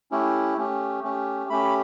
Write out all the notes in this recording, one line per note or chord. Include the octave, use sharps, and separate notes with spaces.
A3 C#4 E4 G4
A3 C#4 G4
A3 C#4 G4
A3 C#4 G4 B5